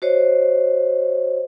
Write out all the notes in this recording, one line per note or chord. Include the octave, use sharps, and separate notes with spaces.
F#4 C5 C#5 D#5